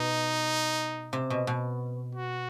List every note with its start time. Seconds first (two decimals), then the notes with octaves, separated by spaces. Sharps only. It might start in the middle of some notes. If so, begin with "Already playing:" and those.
Already playing: B2 D#4
1.13 C3
1.30 B2
1.47 B2
2.15 F#4